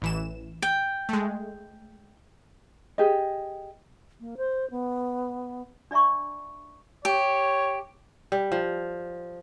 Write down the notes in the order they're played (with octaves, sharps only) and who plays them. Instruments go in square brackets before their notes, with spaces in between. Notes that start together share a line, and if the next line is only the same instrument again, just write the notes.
[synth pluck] A1 E3 E7
[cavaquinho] G5
[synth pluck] G#3 A3
[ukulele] G4 G#4 D#5
[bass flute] A#3
C5
B3
[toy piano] D4 D5 E5 A#5 C#6
[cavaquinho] G4 [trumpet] C#5
[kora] G3
F3